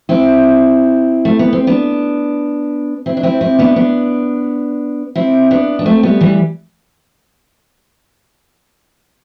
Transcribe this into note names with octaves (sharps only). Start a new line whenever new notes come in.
C4 E4
A3
B3
C4
B3 D4
C4 E4
D4
C4 E4
C4 E4
B3 D4
B3 D4
C4 E4
B3 D4
D4
A3 C4
G3 B3
E3 G3